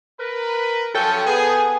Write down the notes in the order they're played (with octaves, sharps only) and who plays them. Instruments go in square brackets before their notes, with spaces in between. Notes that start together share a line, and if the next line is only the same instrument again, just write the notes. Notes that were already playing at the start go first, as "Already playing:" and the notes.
[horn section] A#4 B4
[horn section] F3 F#3 C#4 [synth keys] A4 G5
[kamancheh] B3 G#5 [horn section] G#4